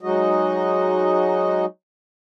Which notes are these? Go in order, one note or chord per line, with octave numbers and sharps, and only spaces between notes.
F#3 G#3 D#4 F#4 D#5